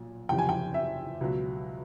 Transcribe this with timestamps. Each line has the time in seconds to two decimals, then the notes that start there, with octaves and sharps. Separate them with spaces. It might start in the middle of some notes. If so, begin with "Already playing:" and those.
Already playing: B1 A#2 F3
0.29 F#1 E2 C3 F3 G5
0.38 G#5
0.49 G5
0.74 E5
1.21 C#2 B2 F#3